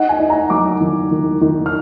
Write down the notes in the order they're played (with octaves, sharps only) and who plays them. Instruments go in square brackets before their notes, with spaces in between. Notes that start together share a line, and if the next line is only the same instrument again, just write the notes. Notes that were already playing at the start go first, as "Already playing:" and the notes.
Already playing: [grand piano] D#4 F#5
G#5
D#4
A#5
F#3 D6
D#3
D#3
D#3
F6